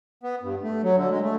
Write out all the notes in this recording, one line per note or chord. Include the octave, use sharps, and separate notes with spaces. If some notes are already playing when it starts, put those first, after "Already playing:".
B3
G2
A3
F#3
D3
G#3
A3